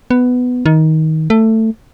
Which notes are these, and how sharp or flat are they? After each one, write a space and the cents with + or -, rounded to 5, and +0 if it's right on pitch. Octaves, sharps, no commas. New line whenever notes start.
B3 +10
D#3 +20
A3 +15